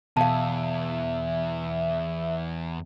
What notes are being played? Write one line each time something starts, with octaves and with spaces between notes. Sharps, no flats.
E2 B2 E5 F5 A5